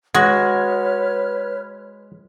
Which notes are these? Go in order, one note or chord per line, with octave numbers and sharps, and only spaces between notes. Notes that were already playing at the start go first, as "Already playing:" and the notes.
G#3 F#4 B4 C#5 F6